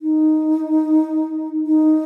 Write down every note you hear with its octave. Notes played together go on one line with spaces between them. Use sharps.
D#4
D#4